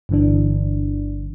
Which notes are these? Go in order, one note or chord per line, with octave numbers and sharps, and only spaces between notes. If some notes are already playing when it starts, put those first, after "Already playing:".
G1 G2 D3 E3 D4